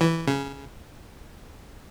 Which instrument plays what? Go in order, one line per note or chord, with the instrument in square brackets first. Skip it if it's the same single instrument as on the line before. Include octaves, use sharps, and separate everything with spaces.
[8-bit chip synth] E3
C#3